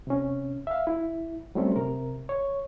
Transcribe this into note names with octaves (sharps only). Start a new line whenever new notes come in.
C3 C#4
E5 F5
E4
F#3 G3 A3 C4 C#4
C3 A#4
C#5